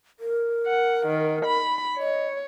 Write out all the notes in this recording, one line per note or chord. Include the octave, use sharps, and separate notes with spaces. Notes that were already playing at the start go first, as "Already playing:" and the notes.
A#4
F#5
D#3
B5
C#5 D#5